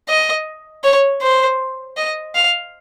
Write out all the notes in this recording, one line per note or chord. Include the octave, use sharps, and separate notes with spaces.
D#5
C#5
C5
D#5
F5